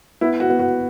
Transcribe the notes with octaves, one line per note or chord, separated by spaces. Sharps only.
B3 E4
F#4
B3
F#4